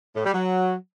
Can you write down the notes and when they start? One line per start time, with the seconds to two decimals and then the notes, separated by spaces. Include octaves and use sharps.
0.16 A2
0.25 G3
0.34 F#3